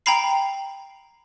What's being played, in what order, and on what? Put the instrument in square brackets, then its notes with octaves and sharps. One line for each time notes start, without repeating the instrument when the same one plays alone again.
[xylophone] G5 A#5 B5 C7